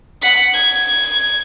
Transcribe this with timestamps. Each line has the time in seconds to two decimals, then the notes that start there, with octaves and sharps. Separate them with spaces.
0.22 F#5 B6
0.53 G#6